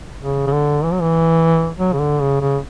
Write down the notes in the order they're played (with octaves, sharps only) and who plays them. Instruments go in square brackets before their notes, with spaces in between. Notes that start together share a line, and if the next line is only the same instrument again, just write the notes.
[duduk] C#3
C#3
D3
E3
F#3
E3
F#3
C#3
D3
C#3
C#3